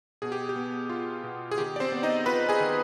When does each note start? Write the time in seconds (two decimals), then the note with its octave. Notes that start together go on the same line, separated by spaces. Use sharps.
0.22 B2 G#4
0.32 G4
0.49 G4
0.56 B3
0.90 F4
1.24 B2
1.51 G#4
1.58 D#3 G4
1.76 D5
1.80 C4 C5
1.92 B3
2.03 D#4 D#5
2.26 F4 B4 B5
2.49 G#4 G#5
2.60 D#3